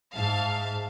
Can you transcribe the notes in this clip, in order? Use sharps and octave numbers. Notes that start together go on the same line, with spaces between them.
G#2 E5 F5 A5